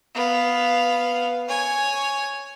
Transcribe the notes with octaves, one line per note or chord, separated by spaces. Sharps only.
B3 F5
C#5 G#5